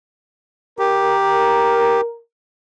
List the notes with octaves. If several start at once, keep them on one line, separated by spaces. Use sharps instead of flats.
G4 A#4